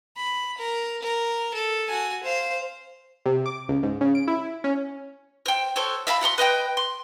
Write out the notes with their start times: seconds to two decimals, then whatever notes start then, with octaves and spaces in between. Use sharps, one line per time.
0.17 B5
0.58 A#4
1.03 A#4
1.54 A4
1.88 F#4 G#5
2.23 C5 F5
3.26 C3
3.46 D6
3.69 C#2
3.83 G#2
4.01 C#3
4.15 D7
4.28 E4
4.64 C#4
5.46 C5 G5
5.76 F#4 A4 C5 C#5
6.07 E5 F5 A5 B5
6.21 F#4 F#5 A#5 C6
6.38 B4 D#5 F#5 G5
6.77 C6